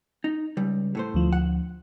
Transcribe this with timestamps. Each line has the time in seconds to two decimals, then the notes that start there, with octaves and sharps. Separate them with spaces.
0.24 D#4
0.57 C#2 G3
0.95 A2 A3 C5
1.14 D2 F3
1.33 F#5